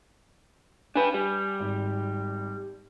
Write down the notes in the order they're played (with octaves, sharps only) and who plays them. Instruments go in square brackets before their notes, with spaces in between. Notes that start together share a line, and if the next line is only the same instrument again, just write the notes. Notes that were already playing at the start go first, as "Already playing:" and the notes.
[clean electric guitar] D4 B4 [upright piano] G#5
[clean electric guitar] G3
[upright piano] G#1